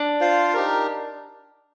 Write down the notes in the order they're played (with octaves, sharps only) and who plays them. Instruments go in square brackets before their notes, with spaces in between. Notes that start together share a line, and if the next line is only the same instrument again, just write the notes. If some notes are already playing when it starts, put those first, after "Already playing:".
Already playing: [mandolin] D4
[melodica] F4 C5 F5
D#4 G4 A#4